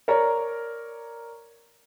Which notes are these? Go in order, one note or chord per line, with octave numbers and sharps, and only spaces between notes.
A#4 C#5 D5 A#5